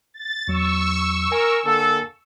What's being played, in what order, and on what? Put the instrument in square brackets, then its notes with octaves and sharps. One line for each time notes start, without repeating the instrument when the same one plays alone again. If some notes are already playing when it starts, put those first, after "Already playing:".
[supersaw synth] A6
[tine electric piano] E2 F#3 [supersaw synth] C#6 E6
[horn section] A#4 [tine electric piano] G#5
[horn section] D3 A#3 A4